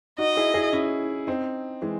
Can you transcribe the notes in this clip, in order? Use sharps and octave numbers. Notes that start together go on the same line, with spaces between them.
D#4 F#4 D#5
E4 G#4
E4 G#4
C#4 E4
C4 D#4
E3 G#3